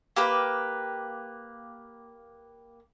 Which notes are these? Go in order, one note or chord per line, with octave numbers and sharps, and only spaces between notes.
A#3 G4 B4